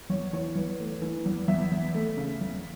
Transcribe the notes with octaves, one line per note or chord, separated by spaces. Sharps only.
E2 C#5
E3 C#5
E2 B4
A3
E3
E2
E2 E5
E2
A3
C#3
E2